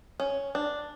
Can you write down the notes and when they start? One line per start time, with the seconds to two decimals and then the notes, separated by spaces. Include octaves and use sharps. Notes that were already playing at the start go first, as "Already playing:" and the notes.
0.20 C#4
0.55 D4